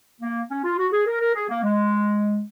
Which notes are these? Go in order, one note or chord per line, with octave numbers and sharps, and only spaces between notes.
A#3
C#4
F4
F#4
G#4
A#4
A#4
G#4
A#3
G#3